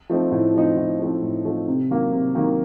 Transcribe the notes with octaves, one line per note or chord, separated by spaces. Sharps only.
F3 A3 C4 D#4
A2
F3 A3 C4 D#4
A2
F3 A3 C4 D#4
A2
F3 A3 C4 D#4
C3
D#3 F#3 A#3
C3
D#3 F#3 A#3